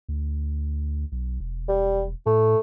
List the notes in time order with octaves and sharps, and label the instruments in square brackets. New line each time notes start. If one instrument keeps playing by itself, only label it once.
[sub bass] D2
B1
E1
[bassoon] G3
[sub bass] A2 [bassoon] A3